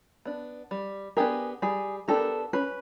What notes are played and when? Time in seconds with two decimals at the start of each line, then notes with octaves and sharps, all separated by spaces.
0.25 B3 D4
0.71 G3
1.17 B3 D4 G4 G#4 A#4
1.62 G3 G#4
2.08 B3 D4 G4 A4 A#4
2.53 C#4 B4